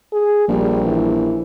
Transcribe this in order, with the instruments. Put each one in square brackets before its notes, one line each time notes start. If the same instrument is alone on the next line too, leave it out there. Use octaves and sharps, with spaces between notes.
[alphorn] G#4
[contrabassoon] A#1 [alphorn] G3
[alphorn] E3